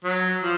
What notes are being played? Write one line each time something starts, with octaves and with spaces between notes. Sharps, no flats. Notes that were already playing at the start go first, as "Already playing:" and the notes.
F#3
F3